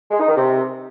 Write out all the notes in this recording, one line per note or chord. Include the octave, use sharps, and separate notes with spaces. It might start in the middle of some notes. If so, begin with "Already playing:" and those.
G#3
D#4
D#3
C3